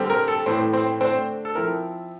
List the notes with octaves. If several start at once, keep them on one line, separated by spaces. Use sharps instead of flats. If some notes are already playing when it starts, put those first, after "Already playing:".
Already playing: D3 G3 C4
A#4
A4
A2 E3 A3 C4 C5
C4 C5
D3 A3 C4 D4 C5
A4
F3 C4 E4 A#4